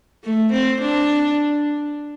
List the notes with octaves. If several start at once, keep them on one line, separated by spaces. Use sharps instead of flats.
A3
C4
D4